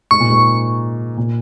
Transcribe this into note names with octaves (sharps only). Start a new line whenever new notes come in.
G#2 C#6
A#2
G#2
A#2